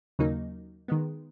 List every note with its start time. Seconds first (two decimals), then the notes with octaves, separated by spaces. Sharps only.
0.19 D#2 C#3 F#3 A#3 D#4
0.88 D#3 G#3 B3